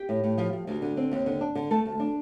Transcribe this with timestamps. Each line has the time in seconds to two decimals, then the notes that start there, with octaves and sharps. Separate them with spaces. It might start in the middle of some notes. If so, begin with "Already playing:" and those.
Already playing: G4 G5
0.09 A2
0.24 A2
0.38 F3
0.53 F3
0.67 D2
0.82 D3
0.97 C4
1.12 D#2
1.26 D3
1.41 D4
1.55 D3
1.70 A3 A4 A5
1.86 D2
2.00 D4